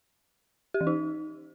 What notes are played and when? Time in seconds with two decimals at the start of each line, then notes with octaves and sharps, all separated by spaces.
0.74 G4
0.81 E3
0.87 D#4